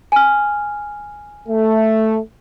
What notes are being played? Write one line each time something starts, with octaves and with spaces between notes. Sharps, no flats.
G#5 F6
A3